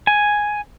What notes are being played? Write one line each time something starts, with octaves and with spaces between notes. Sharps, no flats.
G#5